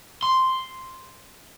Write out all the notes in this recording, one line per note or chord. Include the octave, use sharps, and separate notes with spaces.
C6